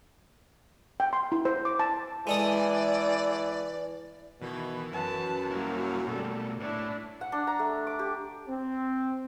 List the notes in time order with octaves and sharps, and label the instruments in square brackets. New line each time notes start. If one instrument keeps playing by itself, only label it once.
[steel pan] G5
C6
E4
C5
D6
A5
[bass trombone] E3 [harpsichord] G#3 A4 D#6 [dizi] D5
[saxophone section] B2 D#3 [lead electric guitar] E3
[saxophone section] F#2 [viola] B4 A5
[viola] F#3 A#3 [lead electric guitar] G3 E4
[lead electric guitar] B2 A3 [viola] G3 A4
[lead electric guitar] A2 C#5 [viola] D4 E4
[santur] F#5
D4
A#5
A3
D6
G4
[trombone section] C4